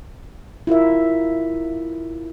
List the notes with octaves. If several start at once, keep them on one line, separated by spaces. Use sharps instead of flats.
E4 F4 A#4 E5